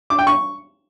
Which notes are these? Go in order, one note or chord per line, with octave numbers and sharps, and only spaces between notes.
D6
G5
C#6